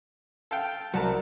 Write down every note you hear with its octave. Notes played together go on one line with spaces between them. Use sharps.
A4 F5 G5
C2 F#3 A#4 F#5 A5